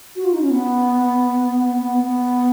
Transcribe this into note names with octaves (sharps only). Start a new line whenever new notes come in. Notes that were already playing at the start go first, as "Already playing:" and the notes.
F#4
F4
D#4
C#4
B3
B3
B3